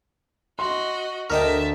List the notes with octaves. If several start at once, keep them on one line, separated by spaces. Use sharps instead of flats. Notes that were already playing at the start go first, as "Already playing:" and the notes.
F#4 D#5 C6
D2 A#4 D#5 E5 G5 A5